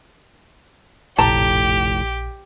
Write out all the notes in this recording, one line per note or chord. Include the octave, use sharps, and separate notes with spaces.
F1 A#1 A2 G4 A5 A#5